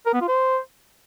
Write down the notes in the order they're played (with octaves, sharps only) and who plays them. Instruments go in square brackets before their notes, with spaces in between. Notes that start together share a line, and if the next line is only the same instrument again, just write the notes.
[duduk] A#4
B3
F4
C5